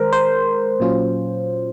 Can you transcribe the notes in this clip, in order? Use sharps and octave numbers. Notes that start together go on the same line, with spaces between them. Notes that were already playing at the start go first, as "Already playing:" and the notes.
Already playing: D#3 G#3 A#4 C5
C5
A#2 F#3 C#4 F4